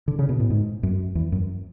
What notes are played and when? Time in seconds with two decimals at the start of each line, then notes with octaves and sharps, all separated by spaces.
0.08 D3
0.19 C#3
0.29 B2
0.40 A2
0.50 G#2
0.83 F#2
1.15 E2
1.32 F#2